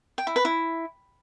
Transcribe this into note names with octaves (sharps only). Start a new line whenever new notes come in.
G5
E4
B4
E4